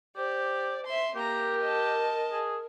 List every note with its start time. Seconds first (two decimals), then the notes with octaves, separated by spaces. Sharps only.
0.17 G4 C5 D5
0.86 E5 C6
1.16 A#3 G4 A#4 A#5
1.62 D#5 A5
2.31 G#4